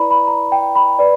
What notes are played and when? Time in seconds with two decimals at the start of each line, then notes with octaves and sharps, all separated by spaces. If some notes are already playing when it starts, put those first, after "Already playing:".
Already playing: E4 B4 D5 A#5 B5
0.11 B5
0.27 A#5
0.52 G5
0.75 B5
0.99 B4 D5